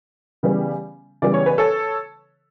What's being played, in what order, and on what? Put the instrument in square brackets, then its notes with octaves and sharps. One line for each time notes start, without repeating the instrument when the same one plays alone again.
[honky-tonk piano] C#3 E3 G3 B3
C#3 E3 G3 B3 D5
C#5
B4
A4 C#5